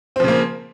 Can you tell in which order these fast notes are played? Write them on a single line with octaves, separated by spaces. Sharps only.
C4 F3 C#3 A#3